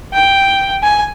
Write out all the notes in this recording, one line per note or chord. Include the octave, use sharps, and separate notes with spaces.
G5
G#5